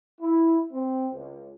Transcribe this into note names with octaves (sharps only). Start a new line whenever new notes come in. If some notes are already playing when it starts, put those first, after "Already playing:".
E4
C4
C#2